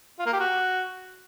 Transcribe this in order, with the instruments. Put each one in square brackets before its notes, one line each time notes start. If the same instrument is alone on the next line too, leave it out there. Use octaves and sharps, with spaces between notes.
[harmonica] F4
A#3
G4
F#4